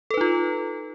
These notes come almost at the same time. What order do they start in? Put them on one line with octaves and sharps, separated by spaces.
A4 B4 D#4 F4